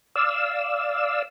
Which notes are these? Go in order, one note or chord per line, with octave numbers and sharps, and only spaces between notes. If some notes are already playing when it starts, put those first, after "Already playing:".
D5 F5 E6